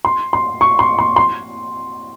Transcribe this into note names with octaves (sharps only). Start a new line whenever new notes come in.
C6
C6
C#6
C6
C6
C6